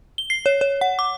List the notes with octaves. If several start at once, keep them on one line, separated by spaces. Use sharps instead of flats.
G7
C7
C#5
C#5
F#5
D6